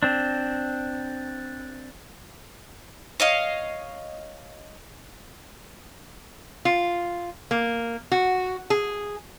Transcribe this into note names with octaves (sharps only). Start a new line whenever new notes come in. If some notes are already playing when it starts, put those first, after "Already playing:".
C4 D4
C#5 D#5 F5
F4
A#3
F#4
G#4